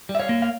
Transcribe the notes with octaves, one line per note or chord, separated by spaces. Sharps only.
G3
E5
C#5 F5
A#3
F5